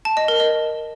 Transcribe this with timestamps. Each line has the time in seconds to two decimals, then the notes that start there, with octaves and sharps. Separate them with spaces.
0.05 A5
0.17 D#5
0.28 A#4
0.40 D#5